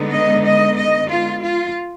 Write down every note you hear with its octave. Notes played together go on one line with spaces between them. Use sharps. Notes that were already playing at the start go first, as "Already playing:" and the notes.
Already playing: D3 G#3 B3 D#4
D#5
D#5
D#5
F4
F4